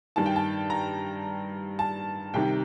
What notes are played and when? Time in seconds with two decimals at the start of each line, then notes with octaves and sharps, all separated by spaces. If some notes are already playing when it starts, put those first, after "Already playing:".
0.16 G2 D#3 A5
0.26 G5
0.36 A5
0.70 A#5
1.79 A5
2.34 C2 C3 D#3 G5